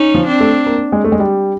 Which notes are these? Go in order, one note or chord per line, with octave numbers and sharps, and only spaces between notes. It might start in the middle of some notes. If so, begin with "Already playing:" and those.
Already playing: C#4 D#4
F3
C4 D4
A3
A#3
G#3
A3
G#3
G3